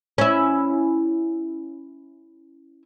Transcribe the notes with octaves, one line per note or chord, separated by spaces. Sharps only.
C#4 E4